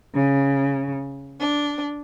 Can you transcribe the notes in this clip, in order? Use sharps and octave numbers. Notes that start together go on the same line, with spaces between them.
C#3
D4